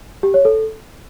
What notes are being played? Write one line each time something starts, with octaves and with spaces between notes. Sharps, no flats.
G4
C#5
A4